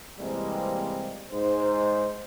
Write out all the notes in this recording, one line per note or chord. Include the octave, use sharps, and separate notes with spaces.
C3 E3 G3 G#3 A#3 C4
G#2 G#3 C5